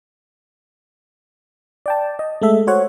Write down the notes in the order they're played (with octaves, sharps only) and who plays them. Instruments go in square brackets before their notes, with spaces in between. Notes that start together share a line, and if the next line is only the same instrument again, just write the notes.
[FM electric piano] D5 G5 A5
D#5
G#3 A3 A4 E5
F#4 C5 C#5 F#5